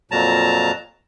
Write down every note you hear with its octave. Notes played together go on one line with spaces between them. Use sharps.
F2 A#2 F#3 A5 A#5